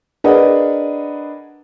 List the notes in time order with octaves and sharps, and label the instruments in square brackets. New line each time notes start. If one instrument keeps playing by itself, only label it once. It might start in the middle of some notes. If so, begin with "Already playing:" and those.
[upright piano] D4 G#4 A#4 B4 D#5 F#5